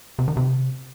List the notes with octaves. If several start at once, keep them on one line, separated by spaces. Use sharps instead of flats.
C3
D#3
C3